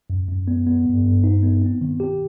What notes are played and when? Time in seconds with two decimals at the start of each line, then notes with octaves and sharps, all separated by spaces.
0.10 F#2
0.28 F#2
0.48 B3
0.67 B3
0.86 G2
1.04 G2
1.24 D#4
1.43 B3
1.62 C4
1.81 D#3
2.00 G4